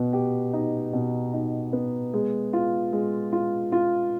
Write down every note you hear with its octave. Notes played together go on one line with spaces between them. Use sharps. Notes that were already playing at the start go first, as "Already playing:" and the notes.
Already playing: B2 B3
G4
D#4
B2
D#4
B3
G#3
F4
G#3
F4
F4